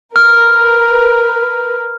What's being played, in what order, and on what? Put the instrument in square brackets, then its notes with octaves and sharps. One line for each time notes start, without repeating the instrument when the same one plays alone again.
[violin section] A#4 B4 [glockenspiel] F6